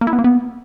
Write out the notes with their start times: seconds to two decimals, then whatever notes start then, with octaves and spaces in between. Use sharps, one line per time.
0.01 A#3
0.07 E4
0.13 B3
0.19 A#3
0.24 B3